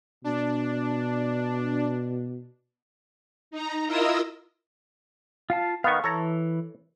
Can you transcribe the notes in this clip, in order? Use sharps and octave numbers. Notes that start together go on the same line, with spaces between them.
B2 D4
D#4 A#5
E4 F4 A#4 D#5 D#6 E6
F4 F5 A5
D#3 B3 F5 C#6
E3 A4 C#5 A#5